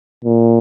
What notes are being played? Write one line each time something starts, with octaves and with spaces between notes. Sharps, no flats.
A#2